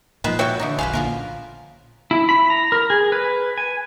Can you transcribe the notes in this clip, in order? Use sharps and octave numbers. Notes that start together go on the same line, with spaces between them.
A#2 D#3 F3 G#3 B4 C5
F#4 A4 C#5 E5 G5
D3 E3 D#4
E1 A#1 C#4 B4 C5 F5
A#2 D3 F3 F4 A#4
E4
B5
A#5
A#4
G#4
B4
G#5